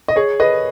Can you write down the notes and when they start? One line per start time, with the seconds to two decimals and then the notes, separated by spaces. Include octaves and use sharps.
0.08 D#5
0.16 G#4 C#5
0.40 B4 D#5